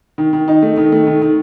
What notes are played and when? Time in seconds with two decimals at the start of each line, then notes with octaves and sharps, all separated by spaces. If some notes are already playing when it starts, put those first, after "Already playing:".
0.18 D#3
0.33 D#3
0.48 D#4
0.63 A3
0.77 D#3
0.92 A3
1.07 D#3
1.21 D#3